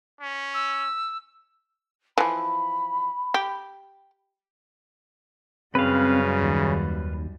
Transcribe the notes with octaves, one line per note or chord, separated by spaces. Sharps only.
C#4
E6
E3 F3 B5
G4
F#2 C#3 G3 C4 B4 F5
D#2